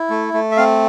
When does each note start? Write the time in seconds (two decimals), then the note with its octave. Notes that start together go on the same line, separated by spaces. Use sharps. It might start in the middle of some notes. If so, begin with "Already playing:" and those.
Already playing: E4
0.10 A3
0.34 A3
0.51 E5
0.57 C4 F5